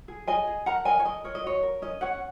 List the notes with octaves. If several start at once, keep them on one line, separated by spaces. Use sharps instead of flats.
G#4
G#4 D#5 G#5
G#4
A#4 F#5 A#5
A#4 D#5 G#5
C#5
A#4 D#5
A#4 C#5
D#5
F#4 C#5
A#4
C#4 D#5
C#4 C#5 F#5